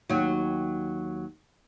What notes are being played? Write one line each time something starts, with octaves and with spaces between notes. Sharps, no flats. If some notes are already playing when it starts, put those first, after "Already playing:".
D#2 F#3